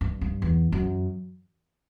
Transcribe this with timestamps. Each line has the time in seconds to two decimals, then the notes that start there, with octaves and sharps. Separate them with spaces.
0.01 G2
0.21 G2
0.42 E2
0.72 F#2